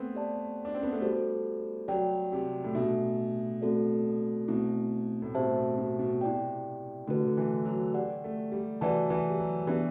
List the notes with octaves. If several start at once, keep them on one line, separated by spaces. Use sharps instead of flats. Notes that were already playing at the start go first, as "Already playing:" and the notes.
Already playing: A3 B3 C4
G4 D5 A5
D4
C4
B3
A3
G3 F#4 A4 C5
F#3 G4 D5 G5
C3
A2
B2 A3 D4 A4 E5
A3 C4 F#4 A4 D5
B2 A3 C4 E4
A2
B2 C4 G4 C5 E5 A5
B2
B2
B2
C3 E4 G4 D5 G5
D3 A3 D4 F#4 B4
D3
E3
F#3
G4 D5 F#5
A3
G3
E3 F#4 B4 D5 F#5 A5
E3
G3
F#3
E3 B3 D4 G4 D5